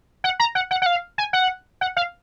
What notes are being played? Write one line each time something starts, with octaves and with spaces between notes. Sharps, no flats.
F#5
A#5
F#5
F#5
F#5
F5
G#5
F#5
F#5
F5